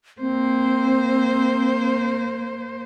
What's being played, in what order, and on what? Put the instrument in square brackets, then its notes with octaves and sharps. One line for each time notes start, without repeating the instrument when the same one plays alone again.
[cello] A#3 C5 [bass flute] C4